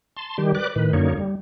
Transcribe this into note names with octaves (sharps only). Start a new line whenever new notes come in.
A5 C6
D#3 G3 G4
B4 D5 D6 F#6
A2 D#3 B4
F#2 D3 A#3 D#4 C#5
G3